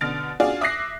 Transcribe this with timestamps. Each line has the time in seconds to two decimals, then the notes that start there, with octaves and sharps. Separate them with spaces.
0.01 B2 D3 F6 A6 D7
0.40 D4 F4 F#4 G#4 D5
0.61 E5 D6 D#6 F#6 A#6 C7